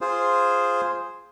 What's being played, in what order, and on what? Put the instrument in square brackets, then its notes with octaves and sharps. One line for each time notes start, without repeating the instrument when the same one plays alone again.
[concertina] F4 G#4 C5